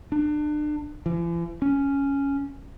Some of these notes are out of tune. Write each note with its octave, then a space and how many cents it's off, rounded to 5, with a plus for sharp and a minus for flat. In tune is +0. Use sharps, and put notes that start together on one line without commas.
D4 +35
E3 +45
C#4 +5